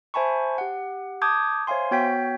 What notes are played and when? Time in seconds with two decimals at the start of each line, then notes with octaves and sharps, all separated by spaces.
0.14 C5 E5 G#5 A5 B5 C#6
0.58 G4 F#5
1.22 A5 D6 D#6 G6 G#6
1.67 C5 C#5 E5 F5 G#5 C6
1.91 B3 F#4 C#5 G5 G6 B6